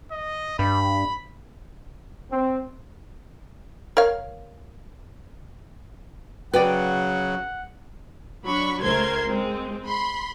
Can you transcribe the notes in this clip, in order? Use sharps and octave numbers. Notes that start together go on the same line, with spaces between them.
D#5
G2 B5
C4
A#4 C#5 F5
C#3 F#3 F#4 B4 D5 F#5 G5
F#3 D4 B5 C#6
C#2 A3 A#4 C5 C6 G#6
G#3 C4
B5 C6